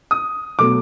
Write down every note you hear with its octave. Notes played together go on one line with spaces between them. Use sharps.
D#6
B2 F#3 A3 D6